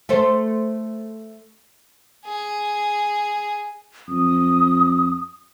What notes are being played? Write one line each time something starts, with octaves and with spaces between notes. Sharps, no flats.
A3 A4 C5
G#4
F2 D#6